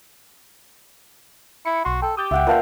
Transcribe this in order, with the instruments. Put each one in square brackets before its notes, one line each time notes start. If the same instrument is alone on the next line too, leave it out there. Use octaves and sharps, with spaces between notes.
[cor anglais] E4 [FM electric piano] C#7
[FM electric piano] B1 C6 [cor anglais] F#4
[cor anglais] A4 [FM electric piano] G5
[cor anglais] G4 [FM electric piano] D#6 G6 A6
[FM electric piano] C#2 [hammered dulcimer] E5 F#5 G5
[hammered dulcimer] A#2 F5 G5 [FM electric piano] B4 A5